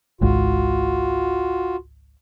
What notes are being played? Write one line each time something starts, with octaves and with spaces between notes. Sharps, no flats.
G#1 C#2 G#2 F4 F#4